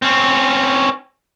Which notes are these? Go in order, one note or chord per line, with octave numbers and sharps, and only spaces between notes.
C4 C#4